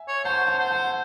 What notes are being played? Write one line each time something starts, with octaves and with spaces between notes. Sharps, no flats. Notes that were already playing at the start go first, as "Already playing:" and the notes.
Already playing: E5 G#5
C#5
C5 F#5 A5
F#5 A5
C5
F#5 A5